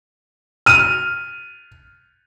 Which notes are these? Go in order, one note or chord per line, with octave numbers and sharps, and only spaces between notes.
F6 D#7